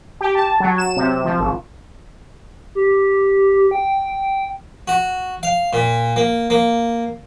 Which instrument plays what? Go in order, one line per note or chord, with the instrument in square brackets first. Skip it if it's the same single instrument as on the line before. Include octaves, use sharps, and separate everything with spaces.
[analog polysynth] G4
A5
F#3
E7
C3
C3
F3
G#1
[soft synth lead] G4
G5
[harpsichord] F#4
F5
A#2
A#3
A#3